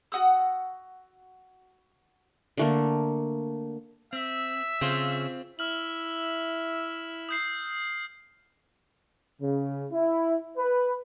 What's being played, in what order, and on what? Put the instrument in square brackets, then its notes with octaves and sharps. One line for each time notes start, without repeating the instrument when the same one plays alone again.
[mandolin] F#4 F#5 D#6 E6
[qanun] D3 A3 A#3
[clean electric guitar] C4 [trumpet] E5
[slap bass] C#3 [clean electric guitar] C4 F4 C5
[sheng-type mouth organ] E4 E5 [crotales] E6 F6 F#7
[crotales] D#6 G6 C7
[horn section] C#3
E4
B4